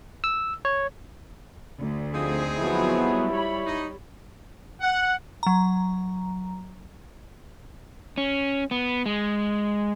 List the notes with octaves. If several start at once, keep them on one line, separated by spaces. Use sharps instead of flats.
E6
C#5
D2
F3 C4 D#4 G#4
F3 F#3 B3 E4
G3
C#5 B5
D#4
F#5
F#3 A#5
C#4
B3
G#3